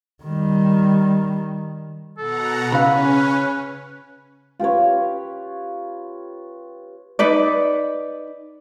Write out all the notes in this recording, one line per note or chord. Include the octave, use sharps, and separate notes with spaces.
D#3 G3
B2 A4 F#5 A#5
C#3 E3 C#4 B4 F5
F4 G4 B4 C#5
D#4 B4 D5